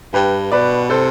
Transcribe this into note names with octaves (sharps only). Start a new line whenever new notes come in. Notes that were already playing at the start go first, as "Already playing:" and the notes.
G2 G4 B4
B2 B4 D5
C3 A4 C5